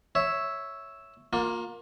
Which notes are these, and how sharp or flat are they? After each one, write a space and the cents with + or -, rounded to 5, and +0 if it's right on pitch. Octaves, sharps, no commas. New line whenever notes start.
C#5 +0 E5 +0
A#3 +0 F4 +30